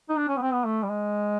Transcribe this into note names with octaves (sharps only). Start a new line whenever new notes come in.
D#4
D4
C#4
B3
C4
B3
A3
G3
G#3